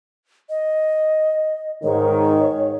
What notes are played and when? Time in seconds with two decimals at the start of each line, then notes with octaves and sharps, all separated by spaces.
0.49 D#5
1.83 G#2 D#3 C#5